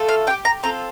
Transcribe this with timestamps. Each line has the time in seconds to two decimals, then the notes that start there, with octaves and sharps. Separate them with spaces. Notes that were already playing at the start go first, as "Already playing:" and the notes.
Already playing: A3 F4 A4
0.09 F5
0.27 D4 G5
0.30 G4
0.45 A#5
0.63 C4 F4 A4 A#5